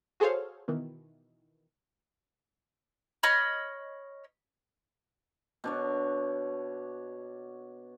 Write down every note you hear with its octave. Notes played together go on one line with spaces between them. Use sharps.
F#4 G#4 A4 C5 C#5 F5
B2 D#3 E3
C#5 D#5 B5 F6
B2 D4 C#5